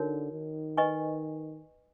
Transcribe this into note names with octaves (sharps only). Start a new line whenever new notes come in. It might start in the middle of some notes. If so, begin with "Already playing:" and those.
Already playing: D3 D#4 F#4 A#4 C#5
D#3
B4 D#5 G#5 C#6